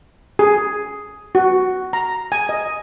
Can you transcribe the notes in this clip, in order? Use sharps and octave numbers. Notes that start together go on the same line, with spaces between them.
G#4
F#4
A#5
G#5
D#5